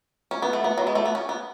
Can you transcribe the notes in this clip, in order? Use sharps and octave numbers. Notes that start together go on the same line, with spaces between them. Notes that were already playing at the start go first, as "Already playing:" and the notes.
C#4
B3
A3
B3
F#3
G#3
A3
B3
C#4
B3